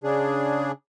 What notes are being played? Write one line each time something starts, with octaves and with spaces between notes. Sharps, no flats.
C#3 D4 G#4